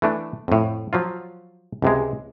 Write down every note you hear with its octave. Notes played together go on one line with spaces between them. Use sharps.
E3 A3 D4
F2 A2
F3 F#3 F4
C#2 C3 G#3